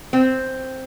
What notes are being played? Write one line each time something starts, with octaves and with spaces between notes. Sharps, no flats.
C4